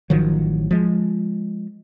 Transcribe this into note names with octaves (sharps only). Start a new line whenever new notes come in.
A1 D#3 F3 F#3
F3 G#3